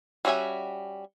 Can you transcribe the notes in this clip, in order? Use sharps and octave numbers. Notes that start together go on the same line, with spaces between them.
G3 C#4 F#4 E5 G#5